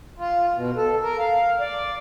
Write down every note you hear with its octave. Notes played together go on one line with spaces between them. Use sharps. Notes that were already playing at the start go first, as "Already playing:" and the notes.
F4
B2
A4
A#4
F5
D5